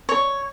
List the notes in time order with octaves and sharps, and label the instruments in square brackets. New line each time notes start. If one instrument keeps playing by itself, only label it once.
[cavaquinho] C#5